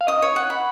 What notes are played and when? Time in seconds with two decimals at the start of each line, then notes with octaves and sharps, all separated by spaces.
0.01 F5
0.07 D#5 D#6
0.22 C#5
0.36 F#5
0.50 B5